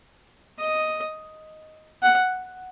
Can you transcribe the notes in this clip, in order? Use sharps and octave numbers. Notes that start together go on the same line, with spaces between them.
D#5
F#5